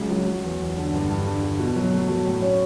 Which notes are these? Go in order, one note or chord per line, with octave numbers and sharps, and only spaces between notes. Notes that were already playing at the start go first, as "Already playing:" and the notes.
Already playing: C#2 C#3 F#3
F#3
F#3
E2
E2
D3
G2
G2
D3
D3
B2
F#3
A3
F#3
A2
C#4